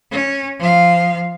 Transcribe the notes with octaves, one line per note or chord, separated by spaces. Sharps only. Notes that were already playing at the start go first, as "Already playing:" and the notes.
C#4
F3 F5